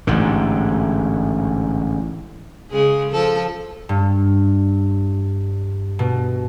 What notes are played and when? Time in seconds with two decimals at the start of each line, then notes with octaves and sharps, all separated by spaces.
0.07 A1 G#2 D3
2.71 C#3 G#3 G#4
3.11 F3 A4
3.89 G2
5.99 B2